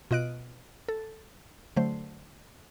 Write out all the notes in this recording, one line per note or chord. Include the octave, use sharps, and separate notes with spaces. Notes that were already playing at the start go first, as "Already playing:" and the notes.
B2 F4 D#5 F#6 D7
A4
D3 F#3 A3 C5